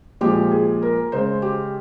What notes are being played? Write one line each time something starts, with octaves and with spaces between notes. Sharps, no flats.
A#2 F3 G#3 G4
G#4
A#4
C#3 G#3 C5
G4